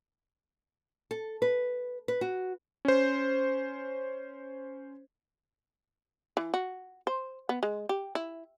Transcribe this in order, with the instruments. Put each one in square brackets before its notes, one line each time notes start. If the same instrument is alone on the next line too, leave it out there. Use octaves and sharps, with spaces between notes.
[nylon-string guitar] A4
B4
B4
F#4
[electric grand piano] C#4 C5
[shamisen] E3
F#4
C5
B3
G#3
G4
E4